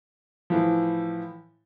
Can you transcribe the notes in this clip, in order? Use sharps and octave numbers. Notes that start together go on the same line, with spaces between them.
A2 E3 F3